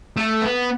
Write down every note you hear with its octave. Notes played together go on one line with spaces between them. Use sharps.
A3
B3